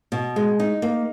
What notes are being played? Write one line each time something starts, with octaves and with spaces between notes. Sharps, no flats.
B2
G#3
D#4
A#3